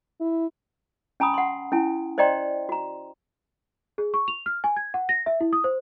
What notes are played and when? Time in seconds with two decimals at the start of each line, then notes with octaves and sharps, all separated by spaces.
0.21 E4
1.20 C#4 G#5 A#5 B5 D#6
1.34 F#5 C6
1.72 C#4 E4 G#5
2.18 C5 D5 D#5 G5 A#5 C6
2.69 F#4 A#5
3.98 G#4
4.14 C#6
4.28 F7
4.46 F6
4.64 G#5
4.77 G#6
4.94 F#5
5.09 A#6
5.26 E5
5.41 E4
5.53 D#6
5.64 C5